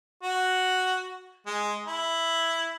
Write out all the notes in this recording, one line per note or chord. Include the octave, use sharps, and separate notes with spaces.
F#4
G#3
E4